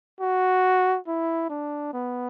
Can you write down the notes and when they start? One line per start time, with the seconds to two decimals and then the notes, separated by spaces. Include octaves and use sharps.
0.21 F#4
1.07 E4
1.50 D4
1.93 B3